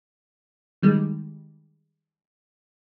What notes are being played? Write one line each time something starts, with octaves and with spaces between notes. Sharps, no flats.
D#3 G3 G#3